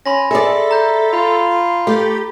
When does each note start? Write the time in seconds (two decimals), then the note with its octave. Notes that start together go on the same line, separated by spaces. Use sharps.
0.06 C#4 B5 C6 A#6
0.31 G#4 A4 D5 E5
0.71 A#5 G6
1.13 F4 B5
1.87 A3 G4